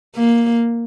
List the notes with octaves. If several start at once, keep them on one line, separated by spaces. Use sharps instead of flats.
A#3